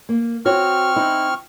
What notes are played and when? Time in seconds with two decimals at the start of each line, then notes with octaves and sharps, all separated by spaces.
0.09 A#3
0.46 C4 F#4 C#5 C#6 F6
0.96 D#4 E4